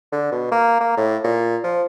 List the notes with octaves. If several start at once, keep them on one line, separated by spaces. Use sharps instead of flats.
D3
B2
A#3
A#3
A2
A#2
F3